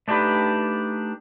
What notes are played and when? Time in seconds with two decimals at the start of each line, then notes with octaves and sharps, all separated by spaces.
0.08 A3 D4 D#4 G4 B4